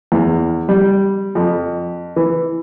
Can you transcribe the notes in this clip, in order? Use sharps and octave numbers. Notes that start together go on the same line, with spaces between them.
E2
G3
F2
E3